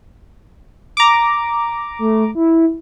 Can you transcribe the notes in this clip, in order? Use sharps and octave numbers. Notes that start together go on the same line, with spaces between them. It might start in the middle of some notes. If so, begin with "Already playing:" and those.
A#5 D6
A3
E4